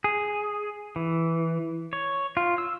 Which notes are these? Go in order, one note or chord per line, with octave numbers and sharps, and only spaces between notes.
G#4
E3
C#5
F4
E6